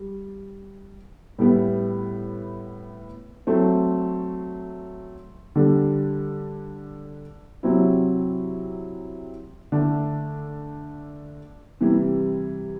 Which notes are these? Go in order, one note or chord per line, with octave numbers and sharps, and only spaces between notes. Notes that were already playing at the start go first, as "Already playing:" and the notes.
Already playing: G3
A2 G3 B3 E4
F#3 A3 C4
D3 G3 D4
C3 F#3 C4 E4
D3 A3 D4
C3 E3 G3